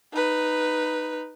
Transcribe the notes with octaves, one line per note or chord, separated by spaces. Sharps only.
D#4 B4